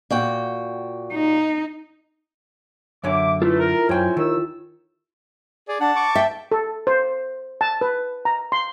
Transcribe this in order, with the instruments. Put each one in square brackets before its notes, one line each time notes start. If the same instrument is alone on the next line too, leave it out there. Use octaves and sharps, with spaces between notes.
[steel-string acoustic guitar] A#2 F#4 G5
[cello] D#4
[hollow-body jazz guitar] F#2 D3 C#5 [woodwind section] E5 D6
[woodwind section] E3 A3 [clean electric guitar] E4 F4 A4
[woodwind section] A#4
[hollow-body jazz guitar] F#2 G5 [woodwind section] C#4 C5 G#5
[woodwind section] D#2 E6 [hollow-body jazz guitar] D#3
[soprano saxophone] G#4 [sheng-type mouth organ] D5
[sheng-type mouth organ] D4 [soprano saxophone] F#5 [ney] A5
[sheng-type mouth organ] C#6 D6
[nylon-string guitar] E5 [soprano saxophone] G5
[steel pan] A4
C5
A5
B4
A#5
C6